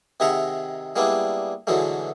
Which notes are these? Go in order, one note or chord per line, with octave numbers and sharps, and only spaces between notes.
C3 D#3 G#4 E5 F#5 A#5
G3 G#3 A#3 B3 D4 E4
B2 D3 E3 F#3 G#3 A3